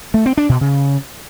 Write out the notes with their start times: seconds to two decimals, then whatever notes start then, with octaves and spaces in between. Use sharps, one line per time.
0.14 A3
0.26 C4
0.37 D4
0.49 B2
0.61 C#3